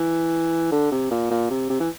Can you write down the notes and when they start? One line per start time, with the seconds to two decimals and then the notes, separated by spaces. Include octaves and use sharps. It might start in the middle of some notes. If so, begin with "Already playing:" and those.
Already playing: E3
0.72 D3
0.92 C3
1.11 A#2
1.30 A#2
1.50 C3
1.70 C3
1.80 E3